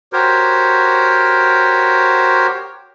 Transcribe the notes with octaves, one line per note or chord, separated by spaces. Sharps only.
F#4 G4 A#4 C5 C#5